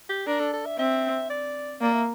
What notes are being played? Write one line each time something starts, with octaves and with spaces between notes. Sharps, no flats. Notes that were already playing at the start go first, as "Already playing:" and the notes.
G4
D4 A#4
A4
A4
E5
C4 E5
D5
A#3 D5
E5